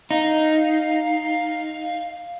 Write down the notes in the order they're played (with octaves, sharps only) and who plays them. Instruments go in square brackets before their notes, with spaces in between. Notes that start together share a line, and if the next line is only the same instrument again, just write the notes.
[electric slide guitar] D#4 [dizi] F5